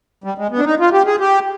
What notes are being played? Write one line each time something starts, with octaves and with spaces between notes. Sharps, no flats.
G3
G#3
B3
D4
D#4
F4
G4
G#4
G4